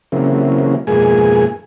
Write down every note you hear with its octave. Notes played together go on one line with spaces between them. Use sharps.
C#3 E3 F#3 A#3 C4
F2 G#2 B2 A#3 G#4 G#5